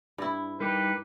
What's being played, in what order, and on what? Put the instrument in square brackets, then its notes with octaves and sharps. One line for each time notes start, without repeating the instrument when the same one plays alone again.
[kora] G2 E4 [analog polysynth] D4
[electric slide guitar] G3 D#4 G4 [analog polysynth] A#4 D6 [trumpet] B4